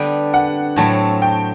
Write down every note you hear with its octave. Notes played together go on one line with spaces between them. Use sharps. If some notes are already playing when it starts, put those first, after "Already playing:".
Already playing: D3 G3 B3 D4
F#5
A2 F#3 A3 C4 A5
G5